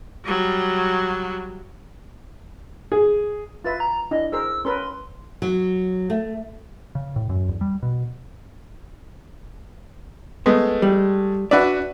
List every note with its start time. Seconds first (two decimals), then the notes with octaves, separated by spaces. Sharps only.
0.24 F#3 G3
2.92 G#4
3.64 F4 B4 E5 A6
3.80 A#5
4.11 D4 E4 D#5
4.32 G#4 A#4 C5 E6
4.65 C#4 A#4 B4 C6
5.42 F#3
6.10 A3
6.95 C#3
7.16 A2
7.29 F#2
7.49 E2
7.61 G3
7.83 B2
10.46 G#3 A3 B3
10.82 G3
11.51 D4 F#4 B4 D5 E5